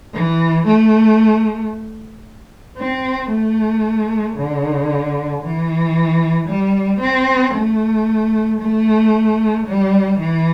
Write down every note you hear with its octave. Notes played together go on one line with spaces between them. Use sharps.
E3
A3
C4
A3
D3
E3
G3
C4
A3
A3
G3
E3